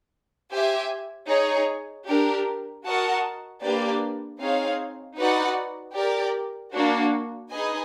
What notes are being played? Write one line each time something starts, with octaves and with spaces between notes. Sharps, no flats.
G4 C5 E5 G#5
D#4 G#4 C#5
D4 G4 A#4
F#4 A#4 D#5 F#5 A5
A#3 D4 G4 B4 D5
C4 D#4 G#4 C#5 F5
D#4 F#4 B4 D5 F#5
G4 A#4 D5
A#3 D4 F#4
D#4 G#4 B4 D#5 G#5